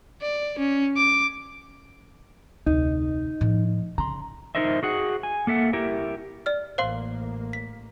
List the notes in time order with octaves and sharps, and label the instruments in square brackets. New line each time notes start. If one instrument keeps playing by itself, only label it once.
[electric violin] D5
C#4
D6
[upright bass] F1 D2 [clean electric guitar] D#4
[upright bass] A2 F3
[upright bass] C#3 [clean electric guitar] A#5 C6
[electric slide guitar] D#4 F4 A#4 C5 D#5 E5
F#4 G#4 F#5
G#5
A#3 A4 E5 F#5
E4 G4 A#4 E5
[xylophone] D5 F6
[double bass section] A1 A#3 [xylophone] C5 F5 C6
[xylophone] B6